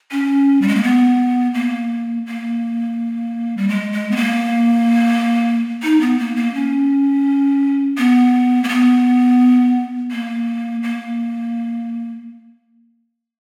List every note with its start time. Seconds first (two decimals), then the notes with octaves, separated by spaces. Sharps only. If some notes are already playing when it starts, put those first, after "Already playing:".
0.11 C#4
0.62 G3
0.68 G#3
0.76 A#3
0.83 B3
1.54 A#3
2.26 A#3
3.57 G3
3.69 G#3
3.92 G#3
4.11 B3
4.16 A#3
5.83 D#4
6.01 B3
6.19 A#3
6.36 A#3
6.54 C#4
7.98 B3
8.64 A#3
8.69 B3
10.11 A#3
10.83 A#3